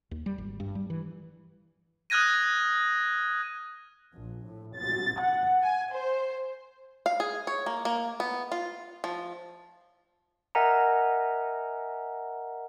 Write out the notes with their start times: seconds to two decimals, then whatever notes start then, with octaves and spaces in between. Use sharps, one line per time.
0.11 D#2
0.26 G3
0.38 G#1
0.60 G2
0.75 G3
0.90 E3
2.10 D#6 F6 F#6 G#6 A#6 D#7
4.14 A#1
4.45 A2
4.76 A6
5.21 F#5
5.63 G#5
5.93 C5
7.06 F5
7.20 G#4
7.47 C#5
7.66 A#3
7.85 A#3
8.20 B3
8.52 F4
9.04 F3
10.55 A#4 D#5 E5 F#5 G#5 A#5